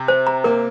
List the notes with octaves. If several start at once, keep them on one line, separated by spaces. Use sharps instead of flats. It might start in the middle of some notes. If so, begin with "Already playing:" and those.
Already playing: C3
C5
A#5
A#3 A#4